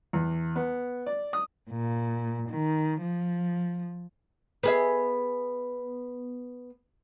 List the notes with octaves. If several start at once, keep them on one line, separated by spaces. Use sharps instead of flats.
E2
B3
D5
D#6
A#2
D#3
F3
B3 G#4 E5